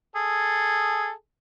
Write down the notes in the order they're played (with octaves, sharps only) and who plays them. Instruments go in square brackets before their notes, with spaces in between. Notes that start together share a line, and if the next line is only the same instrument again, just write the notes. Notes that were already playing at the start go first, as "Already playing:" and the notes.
[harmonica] G#4 A4